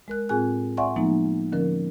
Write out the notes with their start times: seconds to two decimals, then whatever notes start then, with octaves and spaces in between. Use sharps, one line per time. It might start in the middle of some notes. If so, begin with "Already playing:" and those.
0.08 G#3 A#4 F#6
0.29 A2 C4 F4 G#4 G#5 F#6
0.77 D5 E5 F#5 G#5 C6 C#6
0.96 F3 F#3 G#3 A#3 B3 D#4
1.52 D3 F3 C#4 A#4